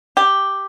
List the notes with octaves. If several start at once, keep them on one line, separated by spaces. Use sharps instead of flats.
G4